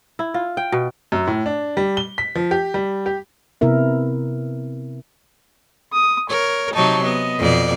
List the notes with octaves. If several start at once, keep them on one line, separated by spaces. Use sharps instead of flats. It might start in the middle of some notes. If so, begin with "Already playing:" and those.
E4
F4
G5
B2
F#2
A2
D4
G3
G7
B6
F3
G4
G3
G4
C3 B3 E4 A#4 E5
D#6
A#4 C#5
C3 F#3 D#4 A5 C#6
B3 D#5
F2 B2 D5